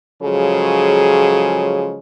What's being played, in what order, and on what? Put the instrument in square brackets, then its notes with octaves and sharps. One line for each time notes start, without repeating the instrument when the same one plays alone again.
[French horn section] C#3 F3 F#3 G#3 G#4 A4